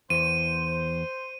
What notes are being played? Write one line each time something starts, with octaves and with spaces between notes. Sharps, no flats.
E2 C5 D#7